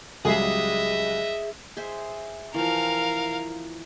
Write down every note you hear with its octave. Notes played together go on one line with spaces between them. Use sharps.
C#2 F#3 G3 G#4 D#5 E5
G#4 C5 E5
E3 F3 A#4 F5